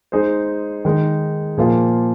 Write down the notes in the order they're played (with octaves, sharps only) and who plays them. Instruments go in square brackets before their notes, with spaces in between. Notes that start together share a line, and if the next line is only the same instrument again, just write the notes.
[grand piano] G#3 D#4 G#4 C5
D#3 G#3 D#4
A#2 F3 A#3 F4 G#4